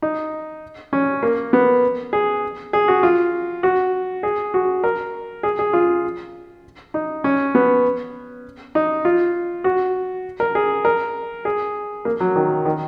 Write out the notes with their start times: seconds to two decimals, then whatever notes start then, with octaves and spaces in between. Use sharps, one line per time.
0.02 D#4
0.93 C#4
1.23 A#3
1.53 B3
2.13 G#4
2.73 G#4
2.88 F#4
3.03 F4
3.63 F#4
4.23 G#4
4.54 F#4
4.84 A#4
5.43 G#4
5.59 G#4
5.73 F4
6.94 D#4
7.24 C#4
7.55 B3
8.75 D#4
9.05 F4
9.64 F#4
10.40 A#4
10.55 G#4
10.85 A#4
11.45 G#4
12.05 A#3
12.20 F#3
12.36 D#3
12.65 D#3